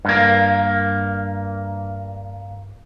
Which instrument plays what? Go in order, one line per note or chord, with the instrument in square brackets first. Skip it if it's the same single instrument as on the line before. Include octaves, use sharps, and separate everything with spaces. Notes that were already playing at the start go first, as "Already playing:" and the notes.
[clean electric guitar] G2 A#3